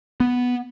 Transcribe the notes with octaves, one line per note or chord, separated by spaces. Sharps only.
B3